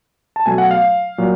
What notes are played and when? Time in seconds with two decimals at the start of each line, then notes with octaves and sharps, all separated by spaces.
0.36 A5
0.46 B2 F#3 A3 G#5
0.58 F#5
0.71 F5
1.18 A#2 F#3